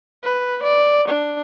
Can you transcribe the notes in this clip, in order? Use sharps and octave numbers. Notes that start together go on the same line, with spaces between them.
B4
D5
D4